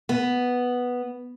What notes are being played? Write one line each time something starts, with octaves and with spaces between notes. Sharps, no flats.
B3